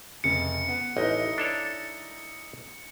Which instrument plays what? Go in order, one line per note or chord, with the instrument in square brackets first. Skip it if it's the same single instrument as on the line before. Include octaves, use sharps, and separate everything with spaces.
[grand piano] F1 C#3 [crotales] C#7
[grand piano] B3
[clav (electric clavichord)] A1 [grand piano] D#4 E4 D#5
[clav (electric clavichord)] D4 A4 C#5